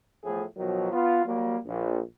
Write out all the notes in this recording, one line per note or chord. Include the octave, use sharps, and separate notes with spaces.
E2 A2 F3 A3 G#4
B2 D#3 F3 F#3
B3 F4
F#3 G3 A#3
A#1